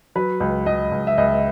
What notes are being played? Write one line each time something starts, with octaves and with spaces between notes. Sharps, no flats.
F#3 B4
C#2
C#2 D#5
C#2
E5
C#2 D#5